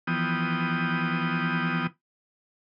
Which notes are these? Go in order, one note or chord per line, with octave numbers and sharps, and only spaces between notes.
E3 F3 B3 G5 D#6